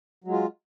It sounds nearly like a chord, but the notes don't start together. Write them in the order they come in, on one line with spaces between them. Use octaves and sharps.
F#3 G#3 F4